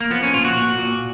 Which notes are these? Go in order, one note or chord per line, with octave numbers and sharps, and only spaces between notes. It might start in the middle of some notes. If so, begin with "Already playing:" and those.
A#3
F3 B3
C#4
A#2 F4
F#4
A#2
A#2